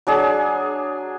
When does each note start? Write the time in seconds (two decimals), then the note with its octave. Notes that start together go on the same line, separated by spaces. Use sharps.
0.07 F#3 D4 G#4